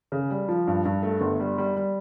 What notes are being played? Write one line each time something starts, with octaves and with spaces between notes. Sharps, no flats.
C#3
G3
F3
G2
G2
A3
G1
G3
G3
G3